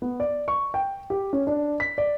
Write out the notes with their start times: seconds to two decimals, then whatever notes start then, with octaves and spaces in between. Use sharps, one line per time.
0.02 B3
0.20 D5
0.48 C#6
0.74 G5
1.10 G4
1.33 C#4
1.47 D4
1.80 B6
1.98 D5